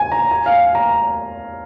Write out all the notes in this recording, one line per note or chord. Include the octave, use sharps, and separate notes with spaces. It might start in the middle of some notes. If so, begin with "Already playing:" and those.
Already playing: G#5
A#5
G#5
F5
A#5